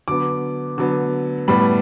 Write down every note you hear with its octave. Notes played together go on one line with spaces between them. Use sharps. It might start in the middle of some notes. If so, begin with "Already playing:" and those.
D3 F#3 B3 D6
D3 F#3 B3
A2 G3 B3 B5